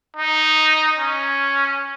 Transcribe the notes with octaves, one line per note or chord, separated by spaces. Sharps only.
D#4
C#4